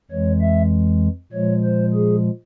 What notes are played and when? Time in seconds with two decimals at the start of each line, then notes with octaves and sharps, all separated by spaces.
0.11 F2 E3 G#3 C#5
0.41 E5
1.33 A#2 F3 G#3 C#5
1.64 C5
1.94 G#4